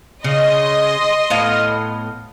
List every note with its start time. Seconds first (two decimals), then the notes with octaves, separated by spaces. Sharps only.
0.24 C#3 D#5 C6
1.30 A2 B3 F5